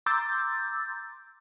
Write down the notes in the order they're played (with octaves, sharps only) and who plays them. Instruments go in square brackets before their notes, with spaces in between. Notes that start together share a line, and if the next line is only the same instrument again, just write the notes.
[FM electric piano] A#5 C6 D6 E6 G6 A6